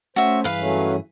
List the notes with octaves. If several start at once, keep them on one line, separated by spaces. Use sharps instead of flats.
A3 C#4 F#4 C5 E5
G2 E3 G#4 B4 F5
F#3 A3 C#4